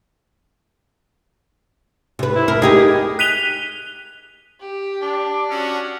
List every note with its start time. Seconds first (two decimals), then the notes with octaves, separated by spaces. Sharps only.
2.19 C3 B4
2.36 E4
2.48 A#4
2.62 D#4 G4 G#4 A#4
3.19 F#6 B6 D#7 F7 G7
4.60 G4
5.02 D4 D6
5.50 C#4 F#4 F#5 E6